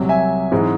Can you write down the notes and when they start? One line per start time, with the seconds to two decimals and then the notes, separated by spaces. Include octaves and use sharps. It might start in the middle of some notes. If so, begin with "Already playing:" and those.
Already playing: C2 C3 F#3
0.09 E5 G#5
0.52 G#2 E3 G#3 C4